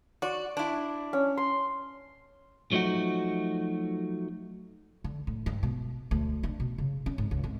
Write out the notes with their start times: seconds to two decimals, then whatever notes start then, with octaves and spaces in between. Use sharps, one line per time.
0.22 F#4 D5
0.57 D4 E4
1.13 C#4
1.37 C6
2.72 F3 F#3 A3 D#4 F#4
5.04 D3
5.27 A2
5.46 G2
5.63 B2
6.11 D2
6.43 D4
6.60 B2
6.78 C#3
7.06 C#4
7.18 G#2
7.31 C#2
7.44 G#1